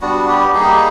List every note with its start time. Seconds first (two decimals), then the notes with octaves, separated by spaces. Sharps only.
0.01 G3 B3 D4 F#4
0.28 G4
0.54 G3 A#3 D#4 G#4
0.63 G4
0.73 G#4